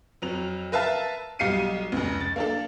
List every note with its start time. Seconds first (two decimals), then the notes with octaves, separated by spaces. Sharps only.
0.22 F2 F#3 F7
0.72 A#4 B4 E5 F5 A5
1.39 B1 G3 F5 C7 C#7 D#7
1.92 F1 C#2
2.21 A6
2.36 A#3 D4 A4